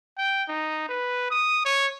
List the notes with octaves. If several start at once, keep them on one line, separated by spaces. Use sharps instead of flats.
G5
D#4
B4
D#6
C#5